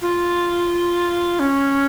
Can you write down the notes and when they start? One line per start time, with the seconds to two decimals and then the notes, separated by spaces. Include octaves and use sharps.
0.02 F4
1.40 C#4